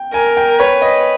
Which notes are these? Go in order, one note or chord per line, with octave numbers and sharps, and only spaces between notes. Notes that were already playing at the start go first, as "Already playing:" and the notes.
Already playing: G5
A#4 G#5
G5
B4 C#5
D#5